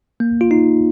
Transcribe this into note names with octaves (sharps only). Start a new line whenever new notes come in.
A#3
F4
D#4